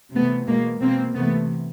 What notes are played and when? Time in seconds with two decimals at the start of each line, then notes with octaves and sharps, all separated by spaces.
0.15 C3 E3 A3 B3
0.48 B2 G#3 A#3
0.82 B2 A#3 C4
1.15 C3 E3 A3 B3